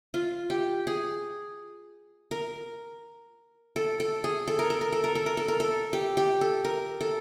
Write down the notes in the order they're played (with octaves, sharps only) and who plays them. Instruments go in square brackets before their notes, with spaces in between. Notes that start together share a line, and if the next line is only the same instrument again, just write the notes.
[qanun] F4
G4
G#4
A#4
A4
A4
G#4
A4
A#4
A4
A#4
A4
A#4
A4
A#4
A4
A#4
A4
G4
G4
A4
A#4
A4